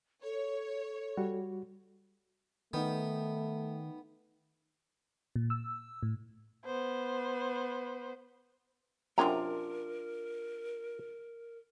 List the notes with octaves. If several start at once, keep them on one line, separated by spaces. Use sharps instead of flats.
A4 C#5
G3 F#4
D#3 A3 B3 D#4 G5
A#2
E6
A2
B3 C5
F#2 C3 D4 F4 A#4 G#5 A#5